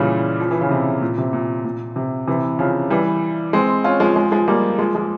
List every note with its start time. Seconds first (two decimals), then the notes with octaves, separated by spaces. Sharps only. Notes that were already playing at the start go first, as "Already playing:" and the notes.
Already playing: A#2 C#3 E3 G3
0.40 F3
0.51 E3
0.61 C#3
0.71 C3
1.02 A#2
1.18 C3
1.33 A#2
1.65 A#2
1.96 C3
2.27 C3 E3
2.59 C#3 F3
2.90 E3 G3
3.53 G#3 C4
3.84 C#4 F4
4.00 F3 G#3
4.16 F3 G#3
4.32 F3 G#3
4.48 G3 A#3
4.79 F3 G#3
4.95 F3 G#3